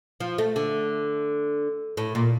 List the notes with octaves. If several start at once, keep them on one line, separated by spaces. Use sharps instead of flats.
F3
A3
D3
A2
A#2